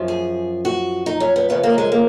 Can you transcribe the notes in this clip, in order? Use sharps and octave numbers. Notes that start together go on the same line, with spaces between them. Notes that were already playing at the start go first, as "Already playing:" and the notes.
Already playing: F#2 F3
G#4
F#4
D#4
C#4
B3
F#2 C#3 F3 B3
A#3
G#3
A#3